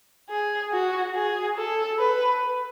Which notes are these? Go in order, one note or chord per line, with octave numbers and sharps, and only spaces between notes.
G#4
F#4
G#4
A4
B4